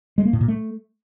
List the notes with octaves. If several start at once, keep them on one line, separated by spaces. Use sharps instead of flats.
G#3
A#3
A2
A#2
A3